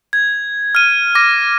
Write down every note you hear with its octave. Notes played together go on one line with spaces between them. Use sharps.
G#6
F6 D#7
D6 A#6 D#7